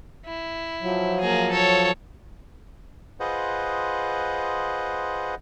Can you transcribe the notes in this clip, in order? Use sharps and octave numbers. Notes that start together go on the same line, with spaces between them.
E4
F3 F#3
A#3 G#4
A4 C#5
F4 G#4 B4 C5 D#5 F#5